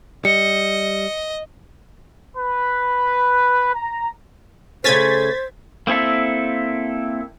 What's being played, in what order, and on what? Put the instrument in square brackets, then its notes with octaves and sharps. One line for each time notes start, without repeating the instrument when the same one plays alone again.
[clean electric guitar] G3 [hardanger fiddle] D#5 [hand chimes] C#7
[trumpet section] B4
A#5
[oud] C#3 A3 C#4 [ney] C5 [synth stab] G#6 A6 B6
[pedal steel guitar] A#3 C4 E4 A4 E5